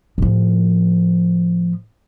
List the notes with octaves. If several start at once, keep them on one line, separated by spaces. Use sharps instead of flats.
A2 F3